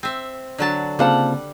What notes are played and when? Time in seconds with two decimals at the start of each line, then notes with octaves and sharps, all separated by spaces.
0.03 C4 E5
0.58 D3 F#3 A5
0.99 C#3 G3 A#3 C4 F4 F5 F#5 A5